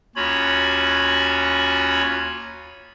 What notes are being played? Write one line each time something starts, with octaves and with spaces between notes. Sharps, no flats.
D#2 C#4 F4 F#4 C#5 B5